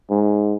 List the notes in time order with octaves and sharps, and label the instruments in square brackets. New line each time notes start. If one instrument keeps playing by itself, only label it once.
[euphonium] G#2